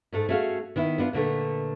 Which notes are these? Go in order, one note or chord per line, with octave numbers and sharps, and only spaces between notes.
G#2 A3 A4
A3 C#4 F#4 G#4 F5
D#3 B3 E4
B3 D4 F4
A#2 D3 A3 B4